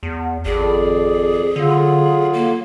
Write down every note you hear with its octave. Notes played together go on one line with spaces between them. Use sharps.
E2
G#1 F2 G#4 D5
D3 F#3 F4
A#3